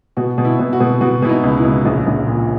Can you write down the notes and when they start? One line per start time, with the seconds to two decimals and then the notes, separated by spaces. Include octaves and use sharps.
0.17 B2 F#4
0.38 B2
0.45 E4
0.59 B2
0.73 F#4
0.80 B2
1.01 B2 F#4
1.22 B2 E4
1.29 D#4
1.43 C#2
1.57 E4
1.65 C#2
1.85 A#1
2.07 A#1
2.27 A#2